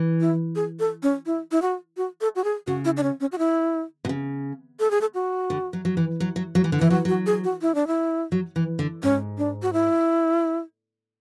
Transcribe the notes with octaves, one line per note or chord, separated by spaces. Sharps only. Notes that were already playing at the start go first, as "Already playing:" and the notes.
Already playing: E3
E4
G#4
A4
C#4
E4
E4
F#4
F#4
A4
F#4
G#4
C#3 F#4
E4
D4
C#4
C#4
F#4
E4
B2
C#3
A4
G#4
A4
F#4
D3
F#3
F#3
E3
F#3
F#3
F#3
E3
D3
E3 E4
F#3 F#4
F#3 F#4
G#4
F#4
E4
D4
E4
F#3
E3
D3
G#2 C#4
D4
F#4
E4